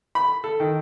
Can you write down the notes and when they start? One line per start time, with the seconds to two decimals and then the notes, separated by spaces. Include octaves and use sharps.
0.15 B5
0.44 A4
0.60 D#3